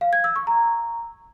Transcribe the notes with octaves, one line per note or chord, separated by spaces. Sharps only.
F5
G#6
E6
C#6
A#5